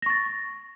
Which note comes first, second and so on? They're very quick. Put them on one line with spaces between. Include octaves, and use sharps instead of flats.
A#6 C#6 A6